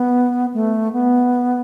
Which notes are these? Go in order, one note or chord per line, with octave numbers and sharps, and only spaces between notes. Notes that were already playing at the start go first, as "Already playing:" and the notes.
Already playing: B3
A3
B3